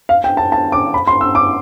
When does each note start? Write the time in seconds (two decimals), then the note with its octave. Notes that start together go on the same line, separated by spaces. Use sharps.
0.09 F5
0.24 G5
0.37 A5
0.52 A5
0.72 D6
0.94 B5
1.07 C6
1.21 E6
1.35 D6